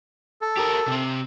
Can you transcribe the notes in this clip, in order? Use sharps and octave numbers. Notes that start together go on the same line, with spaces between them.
A4
G4 A#4
C3 C4